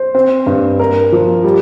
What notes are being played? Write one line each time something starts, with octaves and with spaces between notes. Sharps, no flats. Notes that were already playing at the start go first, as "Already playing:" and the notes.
Already playing: C5
C4
G2
A#4
F3
G3